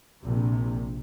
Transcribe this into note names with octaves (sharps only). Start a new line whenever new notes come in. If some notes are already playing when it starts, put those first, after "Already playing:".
A#1 C3